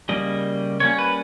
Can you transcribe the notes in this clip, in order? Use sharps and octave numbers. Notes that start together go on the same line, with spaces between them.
C#3 G3 A#3 D#5
G3 A#3 C#4 C#5
B4